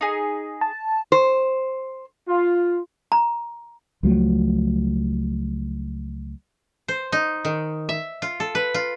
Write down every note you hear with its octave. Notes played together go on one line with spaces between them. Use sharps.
D#4 G#4
A5
C5
F4
A#5
C#2 F3 F#3 A3
C5
D#4
D#3
E5
F4
A4
B4
F4